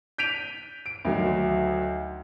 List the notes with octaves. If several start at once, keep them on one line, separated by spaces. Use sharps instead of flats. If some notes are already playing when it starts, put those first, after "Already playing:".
G6 B6 D7 D#7 F7
D7
D2 D#3 F#3